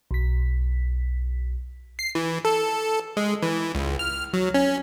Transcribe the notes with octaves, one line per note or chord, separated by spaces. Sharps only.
B1 B6
C7
E3
A4
G#3
E3
C#2
F6
F#3
C#4